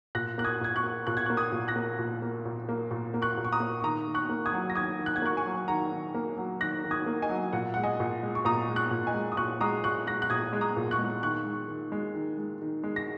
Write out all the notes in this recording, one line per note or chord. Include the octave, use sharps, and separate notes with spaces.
A#2 F#6 A#6
A#3 F#6
D#6 G#6
A#2 G#6
C#6 F#6
A#3
A#2 F#6
G#6
C#6 F#6
A#3
D#6 G#6
A#2
F#6 A#6
A#3
A#2
A#3
A#2
A#3
A#2
A#3
C#6 F#6
A#2
C#6
A#5 D#6
A#3
C#6
D#3 A#5 D#6
D#3
C#6 F#6
A#3
D#6 G#6
F#3
A#6
D#3 D#6 G#6
D#3
F#6
G#6
A#3 C#6 F#6
G#5 C#6
F#3
D#3 F#5 A#5
D#3
A#3
F#3
D#3 F#6 A#6
D#3
D#6 G#6
A#3
D#5 G#5
F#3
A#2 F#5
G#3 F#5
D#5 G#5
A#2
G#3
C#6
A#2 A#5 D#6
G#3
C#6 F#6
A#2
D#5 G#5
G#3
D#6
A#2 C#6 F#6
G#3 A#5 D#6
A#2 C#6 F#6
G#3 F#6 A#6
F#6
A#2 D#6 G#6
G#3
A#5 D#6
A#2
C#6 F#6
G#3
D#3 C#6 F#6
G#3
D#3
G#3
D#3
G#3
D#3
G#3
A#6